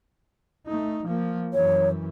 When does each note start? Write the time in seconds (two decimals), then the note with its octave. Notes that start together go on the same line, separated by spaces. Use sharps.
0.67 A3 D#4
1.06 F3 A#3
1.54 F#2 E3 C#5